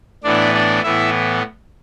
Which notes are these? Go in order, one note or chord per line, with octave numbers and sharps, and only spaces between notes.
A2 E3 B3 D4 D5
D4 D5
A2 E3 B3 E4 E5